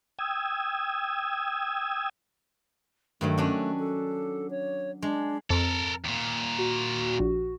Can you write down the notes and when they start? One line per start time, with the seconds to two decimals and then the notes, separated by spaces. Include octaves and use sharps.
0.19 G5 D#6 E6 G#6
3.21 G2 D#3 F#3 A3
3.38 C#4 D4 F#4
3.79 A4
4.50 C#5
5.02 G#3 D4
5.50 F2 A4 A#4
6.05 D#2 A#2
6.58 F#4
7.20 A#1